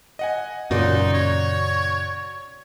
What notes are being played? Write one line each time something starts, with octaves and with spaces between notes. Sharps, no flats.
D#5 F#5 G#5
F#2 A#2 C#3 D#4 F#4 D5 C6
C#5